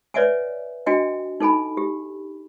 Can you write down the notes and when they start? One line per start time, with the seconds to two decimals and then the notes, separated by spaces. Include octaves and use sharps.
0.14 B4 C#5 D5 E5 F#5 G#5
0.86 D4 F#4 D#5 G5 G#5
1.40 D#4 A4 G#5 B5
1.77 G4